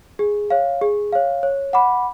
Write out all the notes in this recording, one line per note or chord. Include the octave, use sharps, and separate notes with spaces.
G#4
C#5 F5
G#4
C#5 F5
C#5
F#5 B5 D6